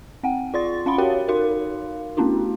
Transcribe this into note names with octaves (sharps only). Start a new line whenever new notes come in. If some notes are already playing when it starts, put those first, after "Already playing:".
C4 F#5 G5
F4 D5 C6 A6
C#4 F5 F#5 B5 C6
F#4 G4 A#4 C#5 F5 G5
D#4 F#4 A#4 F5 C6
A3 B3 C#4 D4 E4 F#4